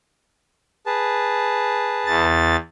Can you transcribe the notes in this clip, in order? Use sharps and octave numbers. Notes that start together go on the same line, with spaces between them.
G#4 B4 A5
E2 A6